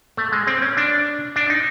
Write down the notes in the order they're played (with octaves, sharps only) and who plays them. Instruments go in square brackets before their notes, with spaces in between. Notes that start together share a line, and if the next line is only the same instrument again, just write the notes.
[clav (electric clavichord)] A3
G#3
C4
C#4
D4
D4
D#4